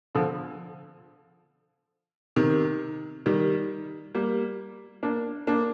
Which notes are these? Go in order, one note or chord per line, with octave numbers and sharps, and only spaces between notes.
D3 F3
C3 D#3
D#3 G3
G3 A#3
A#3 D4
A#3 D4